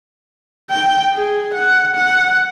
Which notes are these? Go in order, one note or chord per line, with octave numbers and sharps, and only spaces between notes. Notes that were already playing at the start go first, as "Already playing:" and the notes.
G5
G#4
F#5
F#5